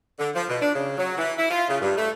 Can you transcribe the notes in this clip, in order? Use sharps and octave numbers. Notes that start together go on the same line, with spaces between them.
D3
F3
B2
D4
C#3
F#3
E3
E4
F4
C#3
G2
A3